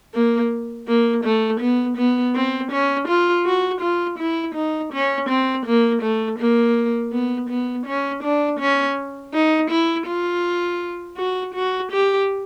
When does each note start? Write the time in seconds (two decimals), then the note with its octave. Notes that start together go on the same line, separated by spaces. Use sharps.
0.14 A#3
0.88 A#3
1.24 A3
1.61 B3
1.97 B3
2.35 C4
2.71 C#4
3.08 F4
3.46 F#4
3.81 F4
4.19 E4
4.55 D#4
4.93 C#4
5.29 C4
5.66 A#3
6.02 A3
6.39 A#3
7.12 B3
7.49 B3
7.86 C#4
8.23 D4
8.60 C#4
9.34 D#4
9.71 E4
10.07 F4
11.17 F#4
11.55 F#4
11.92 G4